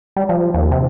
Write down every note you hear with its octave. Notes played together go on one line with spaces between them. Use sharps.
G3
F3
D#2
C3